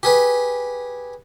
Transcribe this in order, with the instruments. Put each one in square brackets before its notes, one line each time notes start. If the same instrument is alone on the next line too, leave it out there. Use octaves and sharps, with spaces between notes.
[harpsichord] G4 G#4 B4